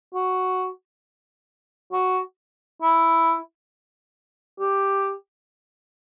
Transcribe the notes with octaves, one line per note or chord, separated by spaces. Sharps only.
F#4
F#4
E4
G4